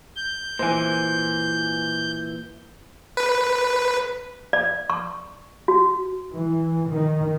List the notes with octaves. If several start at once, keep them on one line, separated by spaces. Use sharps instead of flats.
G6
A#2 E3 C5 G#5
B4
D5
C#6
F#4
E3
D#3